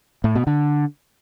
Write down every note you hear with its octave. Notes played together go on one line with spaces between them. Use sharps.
A2
B2
D3